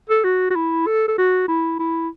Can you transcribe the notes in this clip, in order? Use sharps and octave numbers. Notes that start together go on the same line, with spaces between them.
A4
F#4
F#4
E4
A4
A4
F#4
E4
E4